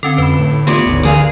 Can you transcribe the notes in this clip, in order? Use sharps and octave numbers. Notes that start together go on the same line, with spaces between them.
D3 C4 C#4 A4
F2 B4 B5
A2
A3 B3 F4 G4 C#5 D5
G1 D2 G#2 C#3
D3 G#4 A#4 D5 F5